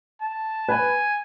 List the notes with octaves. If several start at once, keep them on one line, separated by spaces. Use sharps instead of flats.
A5
B4 G#5